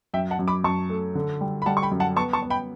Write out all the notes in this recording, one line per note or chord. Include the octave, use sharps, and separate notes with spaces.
F#2 E5 G5
F#5 A5
F#2
B5 D6
F#2 A5 C#6
A3
D3
G3
B5
G3 F#5 A5
C#6
G5 B5
F#2
F#5 A5
B3 A5 C#6
A5 C#6
B3
G5 B5